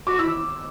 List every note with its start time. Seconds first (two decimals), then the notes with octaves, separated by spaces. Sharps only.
0.07 F#4 D6
0.19 E4 E6